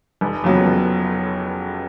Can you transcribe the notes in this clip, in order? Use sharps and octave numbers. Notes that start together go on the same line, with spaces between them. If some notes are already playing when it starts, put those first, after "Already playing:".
F1
F2 C#3 F#3 B3
F1